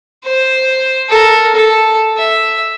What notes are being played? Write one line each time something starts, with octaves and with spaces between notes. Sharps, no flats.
C5
A4 A#4
A4
E5